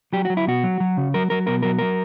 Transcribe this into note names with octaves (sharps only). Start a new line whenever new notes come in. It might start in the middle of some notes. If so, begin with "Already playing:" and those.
F#3 G4
F#3 F#4
E4
B2 F#4
F#3
F#3
C#3
F#3 A#4
F#3 A#4
B2 A#4
F#3 A#4
F#3 A#4